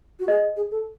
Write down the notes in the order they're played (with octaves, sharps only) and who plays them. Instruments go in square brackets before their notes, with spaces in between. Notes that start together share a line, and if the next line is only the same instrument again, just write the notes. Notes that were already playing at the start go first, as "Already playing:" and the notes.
[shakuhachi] F#4
[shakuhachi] G#4 [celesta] D#5
[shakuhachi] G#4
A4